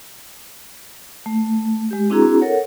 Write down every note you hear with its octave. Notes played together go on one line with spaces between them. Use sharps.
A3
G#3 G4
C4 D4 E4 F#4 G#4 A#5
A4 A#4 C#5 F#5